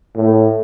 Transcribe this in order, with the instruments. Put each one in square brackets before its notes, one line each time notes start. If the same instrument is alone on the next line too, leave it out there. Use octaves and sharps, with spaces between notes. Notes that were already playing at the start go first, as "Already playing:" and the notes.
[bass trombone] A2